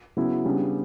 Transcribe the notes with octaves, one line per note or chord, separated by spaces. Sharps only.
C#3 F#3 B3 E4
C#3 G3 B3 D4